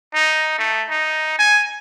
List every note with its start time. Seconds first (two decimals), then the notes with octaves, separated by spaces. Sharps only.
0.14 D#4
0.59 A3
0.89 D#4
1.39 G#5